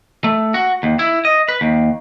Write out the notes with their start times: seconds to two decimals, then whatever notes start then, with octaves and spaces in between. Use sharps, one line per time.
0.24 A3
0.54 F#4
0.83 D#2
0.99 E4
1.25 D#5
1.48 B4
1.61 D#2